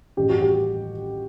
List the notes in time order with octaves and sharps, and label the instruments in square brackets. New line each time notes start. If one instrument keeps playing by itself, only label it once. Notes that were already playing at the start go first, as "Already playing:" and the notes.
[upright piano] A1 G4
F#4
G4